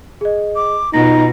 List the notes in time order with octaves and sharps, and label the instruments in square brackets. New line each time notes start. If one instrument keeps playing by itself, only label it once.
[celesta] G#4 D#5
[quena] D6
[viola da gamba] B2 [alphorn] D#4 [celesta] F4 A#6 [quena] A#5